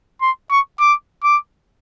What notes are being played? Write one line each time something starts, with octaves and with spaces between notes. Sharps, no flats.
C6
C#6
D6
D6